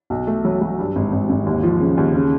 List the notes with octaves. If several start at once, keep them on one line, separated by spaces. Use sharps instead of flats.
B1
A3
F#3
F#3
G2
G#1
G#1
G#1
D#2
F3
C#3
D#2
C#3